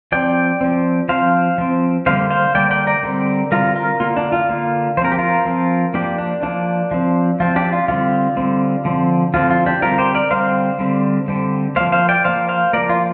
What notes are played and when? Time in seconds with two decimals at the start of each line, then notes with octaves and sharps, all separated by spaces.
0.12 F3 C4 D5 G5
0.61 F3 C4
1.09 F3 C4 C5 F5
1.58 F3 C4
2.06 D3 G3 A#3 C5 F5
2.30 C5 F5
2.55 D3 G3 A#3 D5 G5
2.71 D5 G5
2.87 A#4 D5
3.03 D3 G3 C4
3.51 D3 G3 C4 F4 A#4
3.76 F4 A#4
4.00 D3 A#3 F4
4.17 D4
4.32 F4
4.49 D3 A#3
4.97 F3 C5
5.01 C4 A#4
5.12 G4
5.18 F4 A#4
5.45 F3 C4
5.94 F3 A#3 D4 G4
6.18 D4
6.43 F3 A#3 D4
6.91 F3 C4
7.40 F3 C4 F4
7.56 D4 G4
7.72 F4
7.88 D3 G3 C4 F4
8.37 D3 G3 C4
8.85 D3 F3 C4
9.34 D3 F3 C4 F4
9.50 F4
9.66 D4 G4
9.82 D3 G3 C4 F4 A#4
9.98 G4 C5
10.15 A#4 D5
10.31 D3 G3 C4 C5 F5
10.79 D3 G3 C4
11.28 D3 G3 C4
11.76 F3 A#3 C5 F5
11.92 C5 F5
12.09 D5 G5
12.24 F3 A#3 C5 F5
12.49 C5 F5
12.73 F3 A#3 A#4 D5
12.89 F4